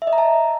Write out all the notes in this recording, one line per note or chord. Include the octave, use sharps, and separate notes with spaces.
E5
D#5
A#5
A5